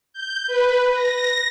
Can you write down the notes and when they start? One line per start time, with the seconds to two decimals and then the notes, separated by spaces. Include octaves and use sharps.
0.13 G6
0.47 B4
0.94 A#6